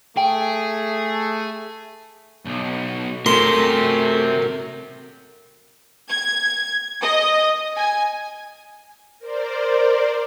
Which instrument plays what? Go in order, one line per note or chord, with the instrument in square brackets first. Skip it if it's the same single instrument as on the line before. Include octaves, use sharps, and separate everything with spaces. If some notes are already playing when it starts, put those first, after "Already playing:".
[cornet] A3 [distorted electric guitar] G#4 [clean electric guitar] G5
[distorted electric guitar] B1
[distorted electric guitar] C3 [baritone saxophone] A3 [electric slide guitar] F#4 A#4 [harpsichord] C6
[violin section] G#6
D#5
G#5
[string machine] A#4 C5 D5